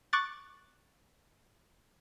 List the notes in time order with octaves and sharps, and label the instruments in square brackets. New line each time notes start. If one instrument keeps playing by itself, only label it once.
[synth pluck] C#6 D6 F#6 A6